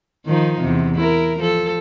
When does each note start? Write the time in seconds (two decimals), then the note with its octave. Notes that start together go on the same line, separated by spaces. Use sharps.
0.26 D#3 F3 D#4
0.61 E2 C3
0.96 E4 A#4
1.40 F3 A4